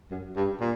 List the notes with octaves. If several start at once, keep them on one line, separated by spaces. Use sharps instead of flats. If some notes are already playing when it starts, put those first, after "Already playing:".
F#2
G2
A#2